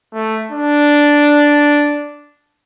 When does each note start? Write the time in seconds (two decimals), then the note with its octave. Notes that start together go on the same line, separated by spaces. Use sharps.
0.13 A3
0.52 D4